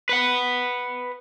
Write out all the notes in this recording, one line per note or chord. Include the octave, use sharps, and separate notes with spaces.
B4 F#5